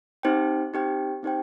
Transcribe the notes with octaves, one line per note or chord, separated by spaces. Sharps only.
C4 D#4 G4 C5 G5
C4 D#4 G4 C5 G5
C4 D#4 G4 C5 G5